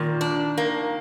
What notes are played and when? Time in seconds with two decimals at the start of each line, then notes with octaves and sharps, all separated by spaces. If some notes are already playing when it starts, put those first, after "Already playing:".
Already playing: A#2 D#3
0.21 D4
0.58 A#3